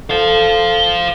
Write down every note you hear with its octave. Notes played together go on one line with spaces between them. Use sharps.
A4 C5 F5